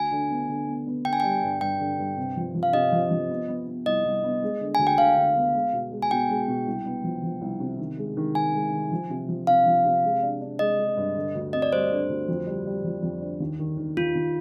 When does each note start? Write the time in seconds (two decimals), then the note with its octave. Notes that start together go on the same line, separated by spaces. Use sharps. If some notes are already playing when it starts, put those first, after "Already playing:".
Already playing: D2 G#5
0.11 D3
0.30 B3
0.49 D3
0.67 B3
0.87 B3
1.05 D3 G5
1.13 G#5
1.20 G3 G5
1.43 G2
1.61 G2 G5
1.80 D3
1.99 G2
2.17 C3
2.37 F3
2.55 F3
2.63 F5
2.73 C3 D#5
2.92 F3
3.11 F3
3.30 B3
3.48 B3
3.67 B3
3.86 C2 D#5
4.05 C2
4.23 B3
4.42 G#3
4.61 D3
4.75 D2 G#5
4.87 G5
4.98 D3 F5
5.17 D3
5.36 B3
5.55 G#3
5.73 B2
5.91 G#3
6.02 G#5
6.11 B2 G5
6.29 G#3
6.48 B2
6.67 C2
6.86 B3
7.04 F3
7.23 F3
7.41 C2
7.60 C3
7.79 D#3
7.97 G#3
8.17 D#3
8.35 D#3 G#5
8.54 G#3
8.73 D#3
8.91 F3
9.10 C3
9.29 F3
9.47 C3 F5
9.66 F3
9.85 C3
10.04 G#3
10.22 D4
10.41 D4
10.59 G#3 D#5
10.79 G#3
10.97 G2
11.16 D3
11.35 D2
11.53 C4 D#5
11.62 D5
11.72 G3 C5
11.91 D3
12.09 D2
12.28 F2
12.47 G3
12.66 G3
12.84 F2
13.03 F2
13.21 D4
13.40 D#2
13.59 D#3
13.77 D#3
13.97 D#2 F4
14.15 D#2